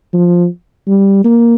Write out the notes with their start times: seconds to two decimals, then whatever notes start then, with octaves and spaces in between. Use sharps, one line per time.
0.13 F3
0.87 G3
1.24 A#3